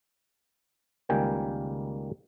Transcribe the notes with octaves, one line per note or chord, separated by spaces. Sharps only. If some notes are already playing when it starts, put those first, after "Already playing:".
C#2 D#3 G3 A#3 G5 G#5